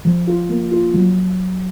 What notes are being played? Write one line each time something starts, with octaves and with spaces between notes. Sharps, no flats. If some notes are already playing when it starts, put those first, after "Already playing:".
F3
F4
A#3
F4
F#3